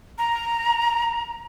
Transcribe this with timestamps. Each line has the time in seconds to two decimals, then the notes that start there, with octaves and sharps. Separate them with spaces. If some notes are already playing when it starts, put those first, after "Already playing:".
0.18 A#5